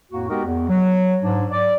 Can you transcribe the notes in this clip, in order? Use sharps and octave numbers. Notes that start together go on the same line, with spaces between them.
F2 A2 A#3 F#4
G#3 B3 D#4 F#4 G4 A#4
E2
F#3
G#2 D4
D5